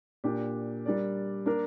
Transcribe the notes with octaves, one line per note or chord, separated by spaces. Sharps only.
A#2 A#3 D4 G4
G3 D4 A#4 D5
A#3 D4 A#4